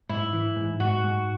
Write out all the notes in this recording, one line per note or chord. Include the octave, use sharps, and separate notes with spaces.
G#2 E4
E3
G#2
G#2 F#4
G#2